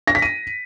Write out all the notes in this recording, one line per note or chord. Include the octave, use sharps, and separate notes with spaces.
A#6
B6
D#7